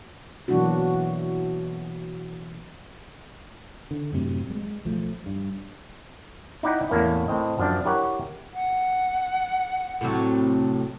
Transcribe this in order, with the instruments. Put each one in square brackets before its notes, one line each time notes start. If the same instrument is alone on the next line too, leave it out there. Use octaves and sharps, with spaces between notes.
[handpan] B2 E3 F#3 A#3 D4 F#4
[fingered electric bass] D3
F#2 A2 C3
G3 G#3
B1 F3 A3
G2
[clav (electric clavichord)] D#4 E4 D5 F#5 G5
E2 A2 A#3 C#4 E4
A2 C4 D#5
F#2 F3 D4
E4 G4 A#4 C#5 F#5
[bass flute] F#5
[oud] A2 C3 F#3